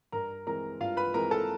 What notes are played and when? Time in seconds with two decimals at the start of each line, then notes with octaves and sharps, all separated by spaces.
0.12 G2 A#4 A#5
0.47 E3 G#3 C4 A#4 A#5
0.80 G2 F4 F5
0.97 B4 B5
1.14 E3 G#3 C4 A#4 A#5
1.31 A4 A5